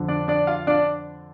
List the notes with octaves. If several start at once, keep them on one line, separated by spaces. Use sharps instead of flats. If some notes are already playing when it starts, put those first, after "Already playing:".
Already playing: F2 D3
D4 D5
D4 D5
F4 F5
D4 D5